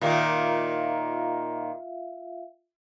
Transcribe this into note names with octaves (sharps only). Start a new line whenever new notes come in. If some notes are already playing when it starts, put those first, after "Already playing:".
A#2 D#3 A#3 F4 E5 F5